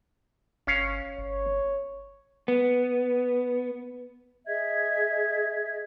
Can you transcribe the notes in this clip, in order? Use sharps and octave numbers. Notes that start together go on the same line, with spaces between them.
G1 C#4 F5
G1 C#5
B3
G#4 D#5 E5 G#6